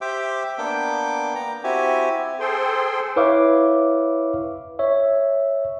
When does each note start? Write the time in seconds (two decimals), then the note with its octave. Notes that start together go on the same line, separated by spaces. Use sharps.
0.01 G4 C5 E5 G5 D6
0.58 A#3 B3 D4 G5 D6
1.35 A#5
1.64 C4 E4 F#4 G4 G#5
2.40 G#4 A4 C5 G5 C6
3.16 E4 B4 C#5 E5 F5 D6
4.79 C#5 E5